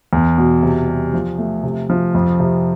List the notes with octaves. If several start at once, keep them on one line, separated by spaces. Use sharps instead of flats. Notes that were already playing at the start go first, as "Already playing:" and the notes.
E2
B2
C3
G3
F3
A3
C3
F3
F2
C3